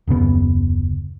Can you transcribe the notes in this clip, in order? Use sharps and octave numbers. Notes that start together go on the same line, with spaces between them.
D#1 F#2 C#3 B3